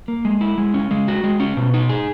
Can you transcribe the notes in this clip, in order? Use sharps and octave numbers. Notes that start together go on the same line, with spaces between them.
A#3
G#3
E4
G#3
C#4
G#3
F#4
G#3
C#4
B2
D#4
G#4